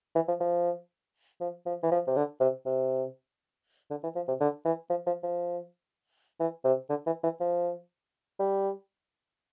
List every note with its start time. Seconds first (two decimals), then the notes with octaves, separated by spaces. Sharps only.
0.15 E3
0.28 F3
0.40 F3
1.41 F3
1.66 F3
1.83 E3
1.91 F3
2.07 C3
2.16 D3
2.40 C3
2.66 C3
3.91 D3
4.03 E3
4.16 F3
4.28 C3
4.41 D3
4.65 E3
4.90 F3
5.07 F3
5.23 F3
6.40 E3
6.65 C3
6.90 D3
7.06 E3
7.24 E3
7.40 F3
8.39 G3